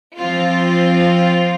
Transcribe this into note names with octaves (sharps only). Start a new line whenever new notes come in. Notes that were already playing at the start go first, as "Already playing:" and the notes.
F3 C4 F4